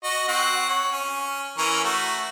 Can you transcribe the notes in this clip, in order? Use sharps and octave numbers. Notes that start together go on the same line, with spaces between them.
F#4 D#5
C4 F#4 F#5
C#5
C#4
E3 C#4 A#4
A3 F#4